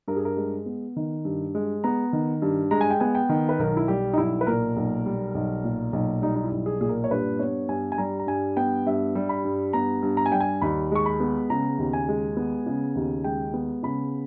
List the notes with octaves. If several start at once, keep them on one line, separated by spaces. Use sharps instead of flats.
G2 A#4
G#4
A#4
G#3
B3
D#3
G2
G#3
B3 A#5
D#3
G2
G#3 A#5
G#5
G5
B3 G#5
G5
D#3
B4
B1 A#4
E4
G3 G4
D#4
B1 E4
B4
A#2 A#4
B1
G3
B1
A#2
B1
G3 D#4
D#4
E4
B1
G#4
A#2 G#4
A#4
C#5
G2 B4
B3 C#5
G2 G#5
G#5
G3 A#5
A#5
G2 G#5
B3 G5
G2 E5
G3
B5
G2
B3 A#5
G2
A#5
G#5
G3 G5
G#5
D#2 B5
G#3 C#6
B5
B3
C#3 A#5
D#2
G#5
G#3
B3
C#3
D#2
G#3 G5
B3
C#3 B5